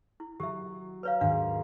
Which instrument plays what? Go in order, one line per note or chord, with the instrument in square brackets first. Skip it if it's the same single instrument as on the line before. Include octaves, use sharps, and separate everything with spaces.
[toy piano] E4
[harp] F#3 [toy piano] G4 E5
[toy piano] B4 C#5 F5 [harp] A#5 F6
[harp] D#2 G#2 [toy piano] D4 F5